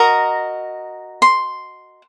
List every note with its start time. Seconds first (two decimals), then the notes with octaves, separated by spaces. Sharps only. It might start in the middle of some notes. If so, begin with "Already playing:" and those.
Already playing: F#4 A#4 D#5 A#5
1.22 C6